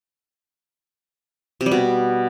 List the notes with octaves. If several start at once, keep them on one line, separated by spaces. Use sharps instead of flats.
C3
G3
B2